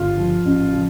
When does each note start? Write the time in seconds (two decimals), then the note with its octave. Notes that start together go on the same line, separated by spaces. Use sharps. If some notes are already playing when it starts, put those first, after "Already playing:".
Already playing: G1 F4
0.18 F3
0.45 A1
0.73 F3